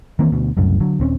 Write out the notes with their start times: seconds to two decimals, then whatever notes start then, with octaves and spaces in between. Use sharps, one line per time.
0.19 D#3 E3 A#3 C4
0.32 D2 B2
0.57 F#1 C2 F#2 A2
0.80 D3 F#3
1.00 D#1 C4 C#4